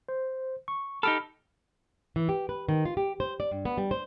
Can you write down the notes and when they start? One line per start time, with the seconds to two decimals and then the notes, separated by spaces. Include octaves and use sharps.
0.09 C5
0.68 C#6
1.03 D#4 G4 A4 B5 F6
2.16 E3
2.29 G4
2.49 B4
2.69 D#3
2.85 F4
2.97 G4
3.20 C5
3.40 D5
3.51 G2
3.65 B3
3.78 G3
3.91 C5